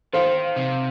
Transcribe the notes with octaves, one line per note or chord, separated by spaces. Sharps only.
D#3 C5 F5
C3